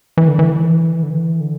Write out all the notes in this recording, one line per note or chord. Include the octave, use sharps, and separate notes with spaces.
E3
D3
E3
D3
E3
D3